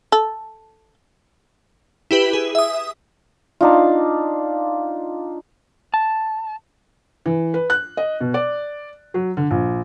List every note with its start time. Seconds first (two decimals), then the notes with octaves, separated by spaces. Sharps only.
0.12 A4
2.11 E4 G4 B4
2.33 G#4
2.55 E5 D#6
3.61 D4 D#4 F4
5.94 A5
7.26 E3
7.54 B4
7.70 F#6
7.97 D#5
8.20 B2
8.34 D5
9.14 F#3
9.37 D3
9.51 A#1